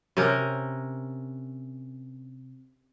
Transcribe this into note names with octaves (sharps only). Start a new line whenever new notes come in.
C3 C#4 A#4